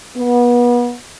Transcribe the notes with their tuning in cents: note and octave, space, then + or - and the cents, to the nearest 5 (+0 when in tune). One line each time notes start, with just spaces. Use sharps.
B3 -30